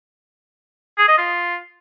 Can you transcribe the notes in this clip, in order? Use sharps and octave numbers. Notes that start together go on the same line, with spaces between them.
G#4
D#5
F4